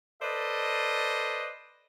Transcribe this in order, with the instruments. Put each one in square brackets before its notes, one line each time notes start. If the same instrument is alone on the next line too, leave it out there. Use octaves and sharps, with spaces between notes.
[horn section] A4 B4 C5 D5 D#5